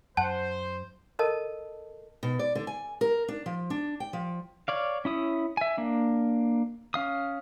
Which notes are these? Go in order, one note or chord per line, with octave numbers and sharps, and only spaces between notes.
F#2 C5 F#5 A5
A4 A#4 D#5 A5
B2
D5
D3
G#5
A#4
D4
F3
D4
G5
F3
C#5 D5 F5
C#4 E4 D#6
E5 G#5
A#3 D4
C#4 F5 D#6